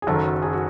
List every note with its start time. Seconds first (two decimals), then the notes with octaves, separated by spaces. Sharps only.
0.02 G#4
0.07 F#1 F#2 D#3 F#3 A4
0.42 G#4
0.53 F#4